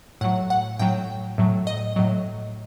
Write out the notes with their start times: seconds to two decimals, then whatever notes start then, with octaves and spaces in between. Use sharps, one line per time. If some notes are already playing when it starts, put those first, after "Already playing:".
0.21 A2 F#3 F#5
0.50 F#5
0.79 A2 F#3 G5
1.38 A2 F#3
1.67 D#5
1.96 A2 F#3